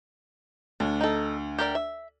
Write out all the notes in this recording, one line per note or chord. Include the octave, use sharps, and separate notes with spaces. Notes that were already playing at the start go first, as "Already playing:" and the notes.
D2 D4
D#4 A4
G4 A#4 D5
E5